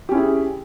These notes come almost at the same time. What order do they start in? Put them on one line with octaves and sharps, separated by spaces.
G4 C#4 E4 G#4